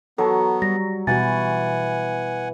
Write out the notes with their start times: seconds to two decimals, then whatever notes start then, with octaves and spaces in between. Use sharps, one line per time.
0.18 F#3 B3 A4 A5 C#6
0.62 G3 A#6
1.07 B2 E3 F#4 F#5 G#5 A6